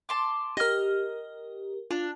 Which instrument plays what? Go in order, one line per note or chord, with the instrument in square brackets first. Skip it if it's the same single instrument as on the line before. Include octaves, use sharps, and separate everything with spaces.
[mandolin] A5 C6 D6
[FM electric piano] G4 A#4 [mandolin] D#5 F6
[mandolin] D4 [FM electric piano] F4